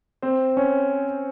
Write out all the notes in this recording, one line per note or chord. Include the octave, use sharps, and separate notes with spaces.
C4 C5
C#4 C#5